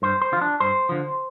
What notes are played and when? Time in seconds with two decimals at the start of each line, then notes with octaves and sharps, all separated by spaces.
0.02 G2 C5
0.22 C5
0.32 D3 F4
0.37 F3 D4
0.60 G2 C5
0.89 D3 F3